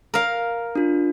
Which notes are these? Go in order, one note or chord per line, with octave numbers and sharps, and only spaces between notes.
A#4 F5
D4 F4